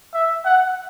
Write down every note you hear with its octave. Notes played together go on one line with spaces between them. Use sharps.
E5
F#5